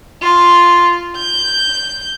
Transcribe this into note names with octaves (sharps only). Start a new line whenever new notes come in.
F4
G6